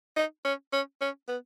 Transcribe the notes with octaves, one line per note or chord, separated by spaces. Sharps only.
D#4
C#4
C#4
C#4
B3